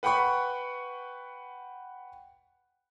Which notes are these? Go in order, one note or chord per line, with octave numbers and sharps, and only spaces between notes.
B4 F#5 G5 B5 C#6